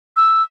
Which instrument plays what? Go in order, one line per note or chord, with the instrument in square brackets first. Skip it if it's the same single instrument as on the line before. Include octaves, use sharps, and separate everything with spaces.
[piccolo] E6